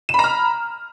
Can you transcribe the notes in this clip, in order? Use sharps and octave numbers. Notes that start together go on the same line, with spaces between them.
A#5 B5 F6 E7